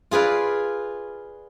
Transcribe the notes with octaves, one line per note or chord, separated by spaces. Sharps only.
F4 G#4 B4 D5 F5